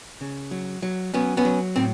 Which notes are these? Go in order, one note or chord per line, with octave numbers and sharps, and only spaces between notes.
C#3
F#3
F#3
F#3 B3 C#4
B3 C#4
F#3
A2 C4